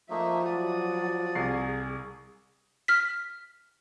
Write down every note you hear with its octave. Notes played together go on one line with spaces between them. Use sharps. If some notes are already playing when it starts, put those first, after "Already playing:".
F3 A3 A#3 D#4 E5
F#3 F#4 D5 D#6
C2 G#4 C7
F6 B6